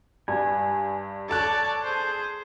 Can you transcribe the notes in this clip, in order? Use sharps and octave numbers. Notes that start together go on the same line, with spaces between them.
G2 G#5
A4 C#5 D5 A5 F#6
G#4 C5